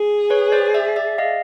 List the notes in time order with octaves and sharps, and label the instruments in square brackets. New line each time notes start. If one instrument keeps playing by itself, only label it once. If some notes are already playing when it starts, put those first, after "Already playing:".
Already playing: [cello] G#4
[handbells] B4 C#5
C5 D5
D5 E5
D5 E5
D#5 F5